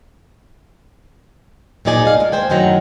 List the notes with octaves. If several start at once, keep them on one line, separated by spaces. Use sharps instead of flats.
A#2 F3 D#4 G#4 D5 G#5
G2 D#4 F5
G#3
D#2 C5 G5 G#5
F#2 A2 D#3 F#3 B4 A#5